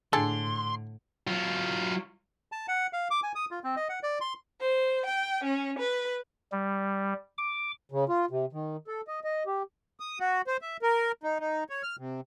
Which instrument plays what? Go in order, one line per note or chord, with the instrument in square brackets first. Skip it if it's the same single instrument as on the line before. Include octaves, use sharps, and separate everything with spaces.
[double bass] A2 [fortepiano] D3 [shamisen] G#4 A4 [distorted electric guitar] C6
[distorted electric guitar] F#3 F4
[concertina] A5
F#5
F5
D6
G#5
D#6
F4
C4
D#5
F#5
D5
C6
[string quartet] C5
G5
C#4
B4
[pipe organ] G3
D6
[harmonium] C#3
F4
C3
D#3
A4
D#5
D#5
G4
[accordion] D#6
F#4
C5
E5
A#4
D#4
D#4
C#5
F6
C3